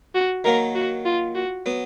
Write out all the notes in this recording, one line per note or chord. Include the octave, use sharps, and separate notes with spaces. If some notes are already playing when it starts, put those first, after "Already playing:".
F#4
D#3 F#3 A#3 A#4
F#4
F4
F#4
F#3 B3